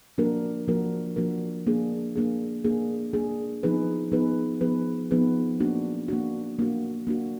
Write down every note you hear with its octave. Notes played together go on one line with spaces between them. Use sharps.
F3 A#3 D4 F#4 A#4
F3 A#3 D4 F#4 A#4
F3 A#3 D4 F#4 A#4
A#3 D4 G#4
A#3 D4 G#4
A#3 D4 G#4
A#3 D4 G#4
F3 B3 D#4 G#4 B4
F3 B3 D#4 G#4 B4
F3 B3 D#4 G#4 B4
F3 B3 D#4 G#4 B4
A#3 D4 F#4
A#3 D4 F#4
A#3 D4 F#4
A#3 D4 F#4